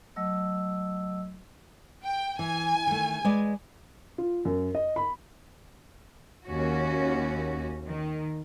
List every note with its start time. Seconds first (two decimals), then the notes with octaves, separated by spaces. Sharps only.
0.16 F#3 A3 D#5 E6
2.04 G5
2.39 E3 G#5
2.87 D#3 A3
3.24 G#3 B4 D5
4.18 F4
4.45 F#2
4.75 D#5
4.96 B5
6.45 D#2 C#4 F#4
7.86 D#3